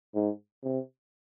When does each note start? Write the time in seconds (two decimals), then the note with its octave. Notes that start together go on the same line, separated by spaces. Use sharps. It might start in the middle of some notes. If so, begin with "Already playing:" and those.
0.15 G#2
0.64 C3